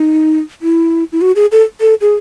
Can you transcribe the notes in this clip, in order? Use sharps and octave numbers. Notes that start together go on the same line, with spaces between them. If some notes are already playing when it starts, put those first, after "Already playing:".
Already playing: D#4
E4
E4
F#4
G#4
A4
A4
G#4